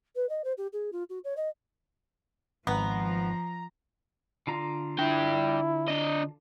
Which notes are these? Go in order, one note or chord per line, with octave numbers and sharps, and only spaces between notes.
B4
D#5
C5
G4
G#4
F4
F#4
C#5
D#5
G#1 F3 B3 F#5 A#5
D3 F4 A#5
D4 E4 G5
D4 D#5